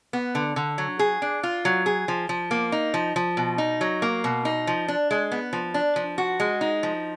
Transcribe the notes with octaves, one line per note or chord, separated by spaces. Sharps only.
B3
D3
D3
F#3
G#4
D4
F4
F#3
G#4
F3
F3
A#3
D#4
F3
F3
B2
D#4
F#3
A#3
B2
D#4
F3
D4
G#3
B3
F3
D4
F3
F#4
G#3
D#4
F3